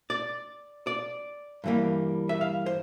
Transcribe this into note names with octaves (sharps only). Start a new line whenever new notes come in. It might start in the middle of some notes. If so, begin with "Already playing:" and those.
D5
D5
G2 E3 G3 A#3
E5
F5
C5